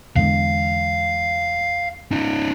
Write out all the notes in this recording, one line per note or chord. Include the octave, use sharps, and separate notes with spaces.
E2 D3 G#3 F5
C#4 D#4